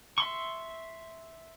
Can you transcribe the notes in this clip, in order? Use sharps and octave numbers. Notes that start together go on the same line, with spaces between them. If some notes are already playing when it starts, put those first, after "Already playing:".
E5 C6 C#6